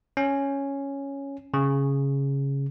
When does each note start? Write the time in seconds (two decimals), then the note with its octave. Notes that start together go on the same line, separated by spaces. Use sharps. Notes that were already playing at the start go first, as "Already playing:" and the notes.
0.17 C#4
1.54 C#3